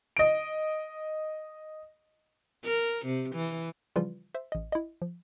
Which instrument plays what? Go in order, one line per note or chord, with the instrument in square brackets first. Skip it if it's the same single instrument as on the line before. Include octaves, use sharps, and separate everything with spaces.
[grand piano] D#5 D7
[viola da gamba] A#4
C3
E3
[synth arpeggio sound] C#3 E3 F3 G3 F4 B4
C5 E5
A1 D#5
E4 D#5
F3